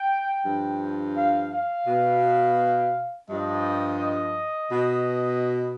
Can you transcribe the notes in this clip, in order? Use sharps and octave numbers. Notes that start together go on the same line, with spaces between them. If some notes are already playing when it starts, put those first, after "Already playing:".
Already playing: G5
G2 F3
F5
F5
B2
G2 F3 D#5
B2